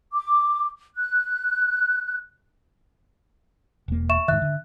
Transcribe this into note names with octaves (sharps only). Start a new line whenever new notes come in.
D6
F#6
E1 A#3
E5 C#6 E7
G#2 C3 D#3 E5 F#6
D3